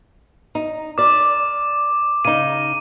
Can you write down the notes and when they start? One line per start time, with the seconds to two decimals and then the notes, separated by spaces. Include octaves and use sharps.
0.55 D#4
0.98 A#4 D5 D6
2.25 C#3 D#4 D#7